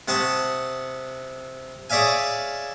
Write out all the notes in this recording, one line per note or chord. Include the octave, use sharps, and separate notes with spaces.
C3 F#5 A5 C6 C#6 D#6
G#4 C#5 D5 E5 F5 G#5